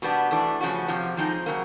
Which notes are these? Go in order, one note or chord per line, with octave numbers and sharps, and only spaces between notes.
B2 G3 B3 D4
E3 A3 D4
C#3 F3 A3 C#4 F#4
F2 C3 F3
F3 G#3 C4 D#4
C#3 F#3 A#3